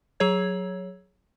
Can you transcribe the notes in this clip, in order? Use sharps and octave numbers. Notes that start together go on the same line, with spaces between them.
F#3 G#4 C#5 G#6